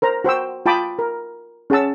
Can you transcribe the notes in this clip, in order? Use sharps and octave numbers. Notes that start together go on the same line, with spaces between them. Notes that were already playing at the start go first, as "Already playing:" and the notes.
A#4 C5 A#5
F#4 C5 G5 E6
F4 G5 A5 B5 D6 D#6
A#4
C#4 G#4 F#5 A5 E6